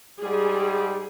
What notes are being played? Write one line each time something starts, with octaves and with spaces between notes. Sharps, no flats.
G#2 G3 G#4